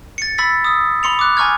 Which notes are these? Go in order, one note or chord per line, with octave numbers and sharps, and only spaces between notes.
A6 C#7
B5 E6 A6 B6
D#6 E6
B5 C6 C#7 F7
D6 F#6
G#5 A#5 C#6 F6 G#6